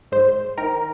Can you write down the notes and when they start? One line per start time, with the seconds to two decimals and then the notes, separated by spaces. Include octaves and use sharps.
0.12 G#2 C5
0.58 D#3 A#4